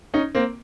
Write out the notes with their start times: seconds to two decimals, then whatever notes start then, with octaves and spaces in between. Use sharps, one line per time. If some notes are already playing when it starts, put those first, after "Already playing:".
0.14 C#4 D#4
0.35 A#3 C4